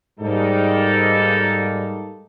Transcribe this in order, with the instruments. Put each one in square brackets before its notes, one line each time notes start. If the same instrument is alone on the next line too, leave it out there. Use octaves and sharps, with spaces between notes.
[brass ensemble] G#2 G3 [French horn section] A#3 D#4 A4